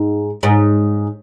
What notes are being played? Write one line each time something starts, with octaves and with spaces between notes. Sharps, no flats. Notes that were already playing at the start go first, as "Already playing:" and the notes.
Already playing: G#2
G#2